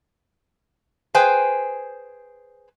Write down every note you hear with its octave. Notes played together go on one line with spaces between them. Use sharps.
G#4 B4 C5 G5 G#5